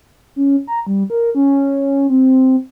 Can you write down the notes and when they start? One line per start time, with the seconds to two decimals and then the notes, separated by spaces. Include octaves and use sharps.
0.36 C#4
0.67 A#5
0.87 G3
1.10 A#4
1.35 C#4
2.10 C4